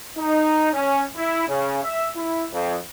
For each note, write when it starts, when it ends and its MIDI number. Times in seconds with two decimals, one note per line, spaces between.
0.18 0.72 63
0.73 1.04 61
1.16 1.47 64
1.48 1.79 49
1.84 2.09 76
2.16 2.44 64
2.52 2.76 41